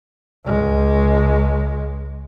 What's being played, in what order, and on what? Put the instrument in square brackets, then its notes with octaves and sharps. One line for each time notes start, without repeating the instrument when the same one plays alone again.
[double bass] C#2 G#3